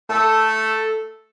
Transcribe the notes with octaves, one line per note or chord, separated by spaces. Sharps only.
A3 A4